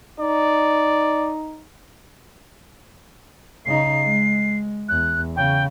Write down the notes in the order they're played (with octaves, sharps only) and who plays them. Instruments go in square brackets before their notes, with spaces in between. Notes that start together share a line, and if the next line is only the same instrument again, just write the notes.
[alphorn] D#4 [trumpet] D5
[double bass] C#3 D#4 [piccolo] C7
[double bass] G#3
[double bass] E2 [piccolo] F#6
[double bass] C#3 [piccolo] G5